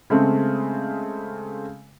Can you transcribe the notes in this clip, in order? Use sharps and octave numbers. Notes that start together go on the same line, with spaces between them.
C#3 G#3 A3 C4